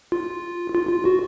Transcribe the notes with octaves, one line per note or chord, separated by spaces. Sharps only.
F4
F4
F4
F#4